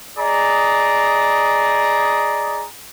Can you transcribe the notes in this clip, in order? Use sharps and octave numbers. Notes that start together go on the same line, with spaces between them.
G#4 D5 D#5 A#5